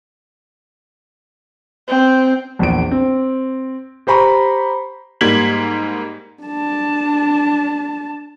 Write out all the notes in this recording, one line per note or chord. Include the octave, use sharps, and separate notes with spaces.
C4
A#1 E2 D7
C4
G4 C5 A#5 B5 C#6
G#2 G3 A#3 G#6 B6 F#7
D4 A5